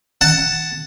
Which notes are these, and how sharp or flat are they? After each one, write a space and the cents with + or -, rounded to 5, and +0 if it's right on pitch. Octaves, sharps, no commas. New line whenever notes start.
F#5 +10 A5 +0